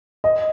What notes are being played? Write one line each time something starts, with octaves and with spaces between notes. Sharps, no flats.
D#5